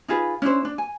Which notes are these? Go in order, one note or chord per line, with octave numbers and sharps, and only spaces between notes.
D#4 F4 G#4 B4
C#4 D4 E4 C5
D4
G#5